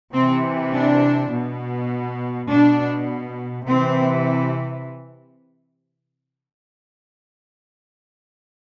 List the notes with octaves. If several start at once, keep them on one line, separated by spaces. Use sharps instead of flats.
C3 E3 C4
D4
B2
B2 D4
C3 E3 C4